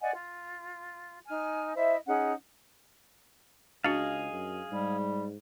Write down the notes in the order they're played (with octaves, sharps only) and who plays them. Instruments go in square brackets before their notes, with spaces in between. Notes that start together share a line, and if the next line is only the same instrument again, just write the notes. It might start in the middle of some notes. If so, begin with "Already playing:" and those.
[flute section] D5 D#5 F#5 G#5
F4
D#4 G#5 F6
E4 C5 D#5 E5
C#4 D#4 G#4 F#5
[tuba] C#2 [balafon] D4 F#4 [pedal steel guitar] G#4 D#5 F5
[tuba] F#2
[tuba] G#2 [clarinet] G3